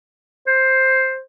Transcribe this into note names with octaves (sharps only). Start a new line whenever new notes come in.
C5